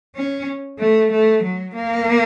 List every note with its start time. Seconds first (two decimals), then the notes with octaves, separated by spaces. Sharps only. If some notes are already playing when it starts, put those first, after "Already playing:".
0.15 C#4
0.79 A3
1.11 A3
1.42 F#3
1.75 A#3